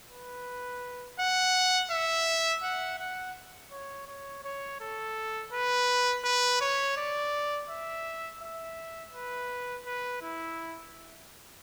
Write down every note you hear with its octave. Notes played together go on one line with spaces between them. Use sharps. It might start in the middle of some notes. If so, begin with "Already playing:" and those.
B4
F#5
E5
F#5
F#5
C#5
C#5
C#5
A4
B4
B4
C#5
D5
E5
E5
B4
B4
E4